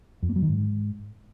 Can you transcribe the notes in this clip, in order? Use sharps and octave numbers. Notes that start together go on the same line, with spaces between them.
F2
A#3
F#3
D#3
G#2